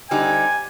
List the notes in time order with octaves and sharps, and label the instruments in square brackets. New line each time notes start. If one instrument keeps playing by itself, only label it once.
[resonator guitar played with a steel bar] D3 G3 C4 D#4 G4 [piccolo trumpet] G#5